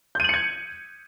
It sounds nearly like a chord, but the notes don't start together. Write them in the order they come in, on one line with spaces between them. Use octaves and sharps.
G6 D#7 F#7 C#7 G#6